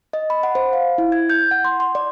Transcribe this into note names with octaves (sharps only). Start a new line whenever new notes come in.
D#5
B5
F#5
C5
F5
E4
G#6
G6
F#5
C6
C6
D5